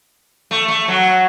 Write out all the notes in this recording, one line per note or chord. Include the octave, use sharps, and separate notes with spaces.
A3
A3
F#3